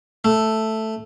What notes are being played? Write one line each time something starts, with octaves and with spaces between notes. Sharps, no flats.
A3